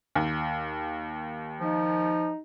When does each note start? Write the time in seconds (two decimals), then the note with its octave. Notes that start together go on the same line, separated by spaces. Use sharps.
0.15 D#2
1.60 F3 D#4